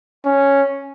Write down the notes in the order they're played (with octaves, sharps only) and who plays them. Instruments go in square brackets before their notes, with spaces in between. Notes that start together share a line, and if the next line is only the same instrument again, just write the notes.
[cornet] C#4